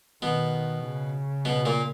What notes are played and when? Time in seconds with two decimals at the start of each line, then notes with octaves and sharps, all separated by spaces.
0.22 B2 D#3 B3
0.84 C#3
1.45 B2 B3
1.66 A#2 A#3